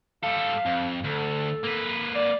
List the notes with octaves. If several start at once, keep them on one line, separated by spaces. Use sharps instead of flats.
G3 A4 F5
F2
D2 A4
A#3 B4
D5